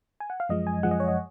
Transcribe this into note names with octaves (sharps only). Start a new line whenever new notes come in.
G#5
F#5
F5
F#2 F3 G#3 D#5
G#5
F#2 F3 G#3 F#5
D#5
C#5
D#5